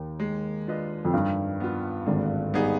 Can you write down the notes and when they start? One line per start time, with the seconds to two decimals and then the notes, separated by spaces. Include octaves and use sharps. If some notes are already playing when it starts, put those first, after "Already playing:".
Already playing: D#2
0.20 G#3
0.67 D4 F4 B4 D#5
1.05 F2
1.14 G2 D#3
1.60 B3 F4
2.06 G#1 G#2 D3
2.54 G3 B3 D#4 G#4